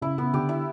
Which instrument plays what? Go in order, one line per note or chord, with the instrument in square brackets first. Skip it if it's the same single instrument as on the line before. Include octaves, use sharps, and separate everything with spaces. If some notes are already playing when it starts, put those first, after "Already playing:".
[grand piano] C#3 [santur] E4
[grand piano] C#3 [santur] B3
[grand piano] D3 [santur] G4
[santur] E4